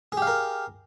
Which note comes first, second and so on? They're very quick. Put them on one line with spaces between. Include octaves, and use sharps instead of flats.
G#4 G4 F5 A#4